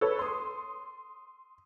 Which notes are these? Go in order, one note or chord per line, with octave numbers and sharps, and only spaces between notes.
A4 B4 C#5
C6 D#6